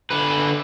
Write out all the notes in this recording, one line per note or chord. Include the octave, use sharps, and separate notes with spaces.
D3 B4